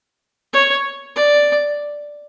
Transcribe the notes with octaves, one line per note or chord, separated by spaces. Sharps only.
C#5
D5